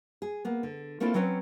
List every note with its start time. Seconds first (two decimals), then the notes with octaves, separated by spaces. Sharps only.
0.22 G#4
0.45 A#3 B3
0.63 D3
1.00 A3 A#3 C4 D4 E4 F4
1.14 F#3 C4 C#4 B4 C#5